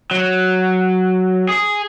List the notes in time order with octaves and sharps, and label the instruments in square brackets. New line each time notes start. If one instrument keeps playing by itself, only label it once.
[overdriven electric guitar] F#3
G#4